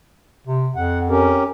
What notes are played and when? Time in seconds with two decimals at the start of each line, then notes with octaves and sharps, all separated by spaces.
0.47 C3
0.76 F2 F#5
1.09 C#4 G4 A#4